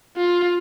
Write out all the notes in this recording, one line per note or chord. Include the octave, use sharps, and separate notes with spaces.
F4